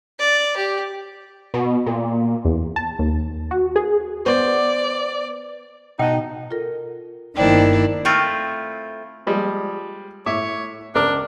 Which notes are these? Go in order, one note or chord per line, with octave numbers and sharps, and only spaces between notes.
D5
G4
B2
A#2
E2
A5
D#2
F#4
G#4
B3 C5 D5
B2 D#4 D#5 F#5 G5 A5
F4 A4 A#4
G1 D#3 A#3 D4 E4 C5 D5 G5
A3 C4 E4 F4
F3 G3 G#3
A2 C#5 E5 D6
C#2 D4 A#4 D6